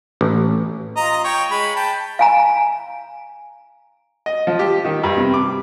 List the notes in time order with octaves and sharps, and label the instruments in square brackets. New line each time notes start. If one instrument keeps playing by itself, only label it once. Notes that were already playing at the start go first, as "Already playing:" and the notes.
[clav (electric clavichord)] A1
[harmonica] F4 D#5 A#5
C#5 G5
G#3 B5
G5 A5
[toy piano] F5 G#5 A#5
[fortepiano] D#5
F3
G4
D#3
G2
C3
D6